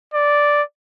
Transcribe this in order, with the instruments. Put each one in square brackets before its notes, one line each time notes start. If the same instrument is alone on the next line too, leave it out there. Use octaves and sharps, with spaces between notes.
[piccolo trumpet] D5